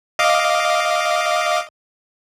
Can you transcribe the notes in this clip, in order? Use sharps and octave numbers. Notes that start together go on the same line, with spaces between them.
D#5 F5 D6